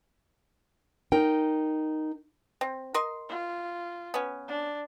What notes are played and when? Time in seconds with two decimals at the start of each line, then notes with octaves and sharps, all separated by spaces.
1.12 D#4 A#4 G5
2.61 C4
2.94 A#4 D#5 C6
3.29 F4
4.14 B3 C#4
4.48 D4